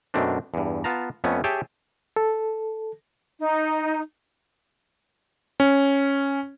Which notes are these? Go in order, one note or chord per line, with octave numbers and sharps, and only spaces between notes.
F#2 B2 A3 C4 D4
E2 G2
B3 F4 A5 A#5
F2 A3 B3 C#4
G4 G#4 C#5 E5 G5 A5
A4
D#4
C#4